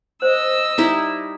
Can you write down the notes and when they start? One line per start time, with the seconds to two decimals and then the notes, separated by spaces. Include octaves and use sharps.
0.22 C5 D#5 E6
0.78 G3 D#4 E4